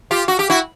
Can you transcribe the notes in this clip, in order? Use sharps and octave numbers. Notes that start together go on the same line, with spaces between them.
F4 G4
F#4
G4
E4 F#4